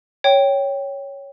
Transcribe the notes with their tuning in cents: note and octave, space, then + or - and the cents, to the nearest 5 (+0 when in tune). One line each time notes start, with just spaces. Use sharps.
C#5 +0 G5 +0